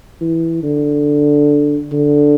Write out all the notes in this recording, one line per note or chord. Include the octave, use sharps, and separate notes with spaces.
E3
D3
D3